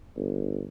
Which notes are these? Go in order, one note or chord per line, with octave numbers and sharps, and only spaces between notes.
G1